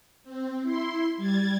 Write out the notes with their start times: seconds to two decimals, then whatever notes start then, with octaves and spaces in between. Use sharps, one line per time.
0.24 C4
0.62 E4 C6
1.17 G3 G#6 A6